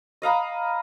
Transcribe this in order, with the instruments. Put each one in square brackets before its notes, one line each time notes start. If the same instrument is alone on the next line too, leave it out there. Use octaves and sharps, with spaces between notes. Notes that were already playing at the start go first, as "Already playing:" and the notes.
[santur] D#5 F5 A#5 B5